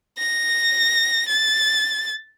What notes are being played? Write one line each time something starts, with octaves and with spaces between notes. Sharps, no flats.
A#6
A6